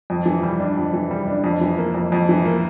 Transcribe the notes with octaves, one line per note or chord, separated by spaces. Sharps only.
F2
E3
G3
D4
F2
E3
G3
D4
F2
E3
A#3
F2
F2
E3
A#3